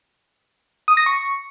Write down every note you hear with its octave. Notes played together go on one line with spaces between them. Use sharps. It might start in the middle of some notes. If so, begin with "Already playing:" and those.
D#6
A#6
C#6